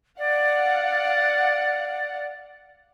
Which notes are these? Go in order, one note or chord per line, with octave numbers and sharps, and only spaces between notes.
D5 F5 F#5